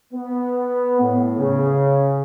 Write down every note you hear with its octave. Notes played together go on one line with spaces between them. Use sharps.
B3
A2
C#3